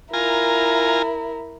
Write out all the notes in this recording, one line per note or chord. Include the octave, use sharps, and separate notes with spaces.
E4 F4 A#4 G#5 A#5